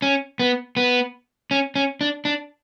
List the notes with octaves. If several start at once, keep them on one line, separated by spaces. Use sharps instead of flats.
C#4
B3
B3
C#4
C#4
D4
D4